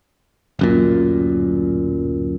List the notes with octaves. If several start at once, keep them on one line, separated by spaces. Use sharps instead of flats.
D1 F#2 A#2